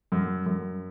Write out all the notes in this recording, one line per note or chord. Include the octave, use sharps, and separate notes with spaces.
F#2
F#2